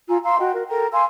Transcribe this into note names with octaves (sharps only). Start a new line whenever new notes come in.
F4 G#5 A#5 E6
F5 A#5 C6 E6
F#4 D#5 G5
F#4 A#4
A4 A#4 G5 A#5
F5 G#5 C6 E6